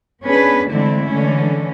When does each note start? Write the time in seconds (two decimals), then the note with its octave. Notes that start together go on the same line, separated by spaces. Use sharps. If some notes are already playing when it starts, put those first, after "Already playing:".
0.22 B3 C#4 D4 G#4 B4
0.68 D3 E3 G#3 A3 C4 E4
1.08 D3 E3 G#3 C#4